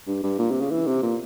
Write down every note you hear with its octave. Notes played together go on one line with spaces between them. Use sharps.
G2
G2
A#2
C3
C#3
E3
C3
A#2